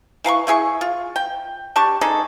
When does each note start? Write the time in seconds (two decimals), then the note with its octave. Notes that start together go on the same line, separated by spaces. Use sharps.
0.24 E3 F5 A#5 C#6
0.47 A3 E4 G#4 C#6
0.81 F4
1.16 G5
1.76 D4 G4 A5 C#6
2.01 G#3 D4 D#4 A4